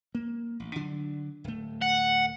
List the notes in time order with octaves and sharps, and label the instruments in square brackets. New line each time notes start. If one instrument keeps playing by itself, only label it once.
[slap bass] A#3
A1
D3 F#3 D4
D1 A3
[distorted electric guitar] F#5